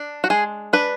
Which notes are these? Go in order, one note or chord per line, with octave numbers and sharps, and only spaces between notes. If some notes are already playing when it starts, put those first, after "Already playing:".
Already playing: D4
F#4
G#3 G#4
D4 B4